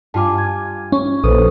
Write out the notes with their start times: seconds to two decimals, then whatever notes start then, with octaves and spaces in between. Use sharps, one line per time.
0.14 G2 F4 G#5 A5 D6
0.38 G#6
0.92 C#4 C#6
1.24 A#1 A4 B4 C5 D#6